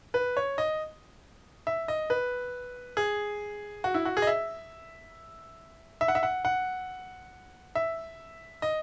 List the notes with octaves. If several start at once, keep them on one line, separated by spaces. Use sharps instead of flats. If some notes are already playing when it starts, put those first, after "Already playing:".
B4
C#5
D#5
E5
D#5
B4
G#4
F#4
E4
F#4
G#4
D#5
E5
E5
F#5
E5
F#5
F#5
E5
D#5